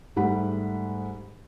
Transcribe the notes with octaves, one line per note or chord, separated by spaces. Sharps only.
G#2 G3 A3 F#5 B5